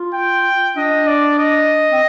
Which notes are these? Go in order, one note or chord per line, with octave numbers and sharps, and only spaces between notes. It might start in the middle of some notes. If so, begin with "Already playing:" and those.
Already playing: F4
G5
D4 D#5
D5
D#5
C4